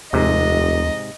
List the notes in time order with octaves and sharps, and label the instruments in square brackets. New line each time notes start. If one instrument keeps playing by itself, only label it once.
[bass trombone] F1 [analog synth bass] D#2 [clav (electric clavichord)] G#2 C3 [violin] D#5